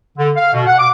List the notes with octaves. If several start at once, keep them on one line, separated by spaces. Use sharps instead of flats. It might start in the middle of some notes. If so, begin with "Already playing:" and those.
D3
F5
B2
F#5
D6